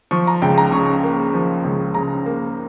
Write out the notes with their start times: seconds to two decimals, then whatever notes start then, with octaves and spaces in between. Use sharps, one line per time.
0.11 F3 C#6
0.27 A#5
0.42 C#2 G5
0.58 A#5
0.72 C#3 C#6
1.03 A#3
1.34 F3
1.64 C#2
1.94 C#3 A#5
2.26 A#3